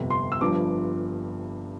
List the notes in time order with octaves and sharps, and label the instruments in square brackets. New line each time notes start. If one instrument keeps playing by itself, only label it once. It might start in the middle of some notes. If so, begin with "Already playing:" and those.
Already playing: [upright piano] G1 F2 C3
C6
E6
G1 G2 F3 D6